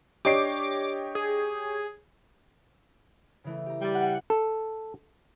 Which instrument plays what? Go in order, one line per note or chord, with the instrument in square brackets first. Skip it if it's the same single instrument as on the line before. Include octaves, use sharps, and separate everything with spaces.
[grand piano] D4 D#5 D7 [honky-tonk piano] G4 C#5 C7 [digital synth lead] D6
[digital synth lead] G#4
[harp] C#3 E3 A3
G4 A#5
[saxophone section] G3
[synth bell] F#5
[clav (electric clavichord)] A4